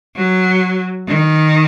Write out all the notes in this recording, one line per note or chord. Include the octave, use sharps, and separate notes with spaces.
F#3
D#3